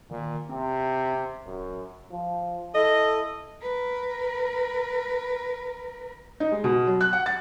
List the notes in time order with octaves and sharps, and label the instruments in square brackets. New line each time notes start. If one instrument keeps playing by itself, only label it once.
[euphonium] A#2 [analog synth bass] D#3
[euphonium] C3 [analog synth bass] C4
[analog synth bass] D1 [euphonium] F#2
[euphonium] F3
[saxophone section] E4 D#5 [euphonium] A4
[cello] A#4 B4
[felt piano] D#4
G#3
B2
F#3
F#6
F#5
A6